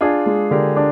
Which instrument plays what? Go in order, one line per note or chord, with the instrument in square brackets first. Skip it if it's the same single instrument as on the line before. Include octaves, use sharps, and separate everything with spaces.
[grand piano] D4 [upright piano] F4 G#4
[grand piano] G#3
[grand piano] D3 [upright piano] G4 A#4
[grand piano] D4